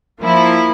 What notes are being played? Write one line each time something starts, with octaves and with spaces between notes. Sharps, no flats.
F3 A#3 E4